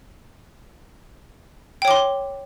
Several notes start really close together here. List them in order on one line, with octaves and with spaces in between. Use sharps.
G5 C#5 D6 C6